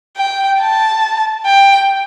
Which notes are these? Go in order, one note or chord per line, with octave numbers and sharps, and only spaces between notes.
G5
A5
G5